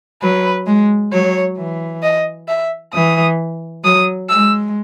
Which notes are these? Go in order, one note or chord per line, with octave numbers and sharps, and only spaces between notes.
F#3 B4
G#3
F#3 C#5
E3
D#5
E5
E3 D#6
F#3 D#6
G#3 E6